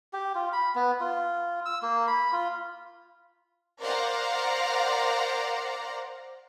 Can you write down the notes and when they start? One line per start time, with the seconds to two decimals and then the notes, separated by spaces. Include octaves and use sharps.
0.13 G4
0.35 F4
0.53 B5
0.75 B3
1.00 F4
1.66 E6
1.82 A#3
2.07 B5
2.33 F4
3.81 A#4 C5 D5 F5 F#5 A#5